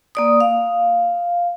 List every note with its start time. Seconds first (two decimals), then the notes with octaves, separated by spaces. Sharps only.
0.15 A#3 D5 D#6
0.40 F5